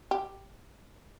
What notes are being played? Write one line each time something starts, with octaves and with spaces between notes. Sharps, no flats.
G4